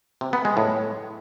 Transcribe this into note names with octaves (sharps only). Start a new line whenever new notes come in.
C3
B3
G#3
A2